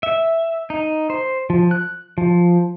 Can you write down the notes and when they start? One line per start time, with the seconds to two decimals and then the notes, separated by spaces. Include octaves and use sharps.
0.03 E5
0.70 D#4
1.10 C5
1.50 F3
1.71 F#6
2.18 F3